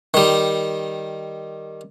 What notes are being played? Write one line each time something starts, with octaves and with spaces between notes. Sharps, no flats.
D#3 G3